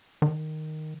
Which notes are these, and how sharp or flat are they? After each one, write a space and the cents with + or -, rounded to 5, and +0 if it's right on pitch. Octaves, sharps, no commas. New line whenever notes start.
D#3 -5